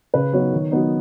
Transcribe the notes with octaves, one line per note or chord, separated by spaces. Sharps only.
C#3 B4
F#3 B3 D#4 C#5
D#3
F#3 B3 D#4